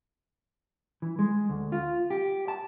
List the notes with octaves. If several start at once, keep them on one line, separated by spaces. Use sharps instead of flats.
E3
G#3
D2
F4
G4
A5